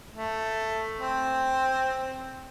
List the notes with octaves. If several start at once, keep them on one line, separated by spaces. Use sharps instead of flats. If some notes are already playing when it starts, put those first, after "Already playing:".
A3
C4